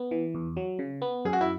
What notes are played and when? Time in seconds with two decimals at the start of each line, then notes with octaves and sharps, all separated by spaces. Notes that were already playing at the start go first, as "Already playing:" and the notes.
Already playing: B3
0.11 E3
0.35 E2
0.57 F#3
0.79 C#3
1.02 B3
1.25 F#2 G#4
1.33 F#4
1.41 E4